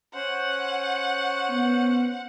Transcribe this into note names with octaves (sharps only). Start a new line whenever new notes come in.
C#4 C5 F#5
B3